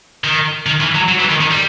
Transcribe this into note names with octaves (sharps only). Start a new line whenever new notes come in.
D#3
D#3
E3
F#3
F#3
E3
D#3
D#3
G3